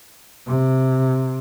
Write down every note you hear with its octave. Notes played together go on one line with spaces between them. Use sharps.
C3